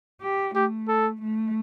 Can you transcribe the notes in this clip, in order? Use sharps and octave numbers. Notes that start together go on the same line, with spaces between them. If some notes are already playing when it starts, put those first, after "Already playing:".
G4
A3 G4
A4
A3